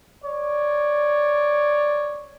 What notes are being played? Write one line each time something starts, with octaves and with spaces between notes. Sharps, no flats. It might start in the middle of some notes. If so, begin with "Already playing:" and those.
C#5 D5